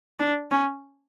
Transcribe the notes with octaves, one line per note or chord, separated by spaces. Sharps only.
D4
C#4